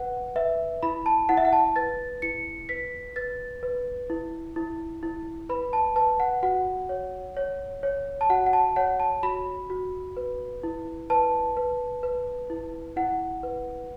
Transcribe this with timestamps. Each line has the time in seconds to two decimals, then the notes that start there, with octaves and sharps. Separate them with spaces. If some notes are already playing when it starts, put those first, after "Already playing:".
Already playing: B4 F#5
0.36 B4 E5
0.83 E4 B5
1.06 A5
1.29 E4 F#5
1.37 E5
1.45 F#5
1.53 A5
1.76 B4 A6
2.22 E4 C#7
2.69 B4 B6
3.16 B4 A6
3.63 B4
4.10 E4
4.56 E4
5.03 E4
5.49 B4 B5
5.73 A5
5.96 B4 A5
6.20 F#5
6.43 F#4 F#5
6.89 C#5
7.37 C#5
7.83 C#5
8.21 A5
8.30 F#4 F#5
8.46 F#5
8.53 A5
8.76 C#5 F#5
9.00 A5
9.23 F#4 B5
9.70 F#4
10.17 B4
10.63 E4
11.10 B4 A5
11.57 B4
12.03 B4
12.50 E4
12.96 E4 F#5
13.43 B4